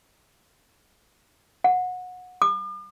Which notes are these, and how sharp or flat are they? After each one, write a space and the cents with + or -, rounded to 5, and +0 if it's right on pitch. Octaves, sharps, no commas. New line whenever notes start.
F#5 -25
D6 +45